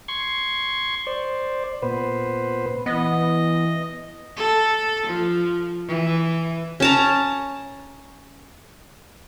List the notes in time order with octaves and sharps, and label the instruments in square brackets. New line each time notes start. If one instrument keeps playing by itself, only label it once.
[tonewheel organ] C6 C#6 G#6
C5 D5
A#2 B3 B4 C5
[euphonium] E3 [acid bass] B3 [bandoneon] D#5
[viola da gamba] A4
F3
E3
[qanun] C#4 A5 A#5